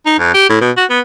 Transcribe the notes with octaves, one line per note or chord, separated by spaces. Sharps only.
D#4
F2
G4
A2
B2
F#4
B3